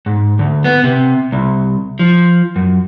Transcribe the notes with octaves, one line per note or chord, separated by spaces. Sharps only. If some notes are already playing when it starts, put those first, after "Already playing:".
G#2
D2
B3
C3
C2
F3
F#2